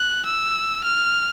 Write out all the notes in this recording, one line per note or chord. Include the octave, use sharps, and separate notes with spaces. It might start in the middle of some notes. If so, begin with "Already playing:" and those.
Already playing: F#6
E6
F6